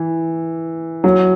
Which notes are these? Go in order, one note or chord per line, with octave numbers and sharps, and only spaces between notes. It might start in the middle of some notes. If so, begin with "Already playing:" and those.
Already playing: E3
F#3